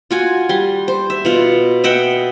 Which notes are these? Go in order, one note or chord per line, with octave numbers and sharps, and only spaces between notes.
F4 F#4 G#5
G3 C6
C5
E5
B2 F4
D#5 E5 F#5 G5